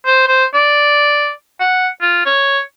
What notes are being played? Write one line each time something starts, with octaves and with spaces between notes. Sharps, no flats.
C5
C5
D5
F#5
F4
C#5